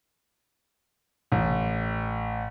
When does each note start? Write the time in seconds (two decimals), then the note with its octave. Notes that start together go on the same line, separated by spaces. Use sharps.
1.32 A1